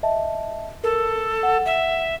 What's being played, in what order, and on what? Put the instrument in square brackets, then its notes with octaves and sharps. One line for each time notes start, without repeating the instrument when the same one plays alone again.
[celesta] D#5 E5 A5
[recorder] A4 [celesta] A#4
[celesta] F#5
[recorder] E5